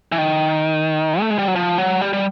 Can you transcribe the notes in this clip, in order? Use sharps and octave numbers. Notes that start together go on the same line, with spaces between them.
E3
D#3
A3
G#3
G3
F#3
F3
F#3
G3
G3